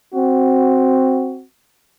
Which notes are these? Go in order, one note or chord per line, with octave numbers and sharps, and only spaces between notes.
C4 F#4